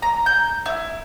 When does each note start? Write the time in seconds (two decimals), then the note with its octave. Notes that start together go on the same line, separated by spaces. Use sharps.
0.02 A#5
0.26 G6
0.66 E4